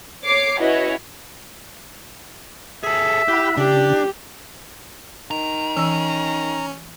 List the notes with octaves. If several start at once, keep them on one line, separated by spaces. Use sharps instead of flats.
C#5 D6 C7
C#4 E4 F#4 B4 C#5 D#5
G#4 A4 E5
E4 G4 F#5 B5
C#3 D4 G4
D#3 A#5
E3 C#4 E6